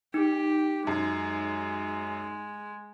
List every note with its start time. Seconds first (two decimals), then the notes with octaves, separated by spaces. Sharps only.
0.14 D#4 G4
0.87 F#2 G#3